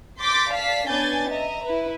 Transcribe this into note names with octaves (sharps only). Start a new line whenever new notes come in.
C6 D6 G6 A6 B6
D5 F5 A5 B6 C7
B3 C#4 D4 G#5 G6 A6
D#5 E5 A#5
E4 B4